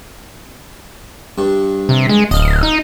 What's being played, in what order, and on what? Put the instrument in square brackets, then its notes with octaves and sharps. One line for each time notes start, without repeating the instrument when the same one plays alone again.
[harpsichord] G2
[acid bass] C3
G#3
[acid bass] D1 [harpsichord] D#5 F5
[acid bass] D#4